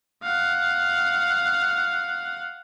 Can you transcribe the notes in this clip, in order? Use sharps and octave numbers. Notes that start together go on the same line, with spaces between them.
F5 F#5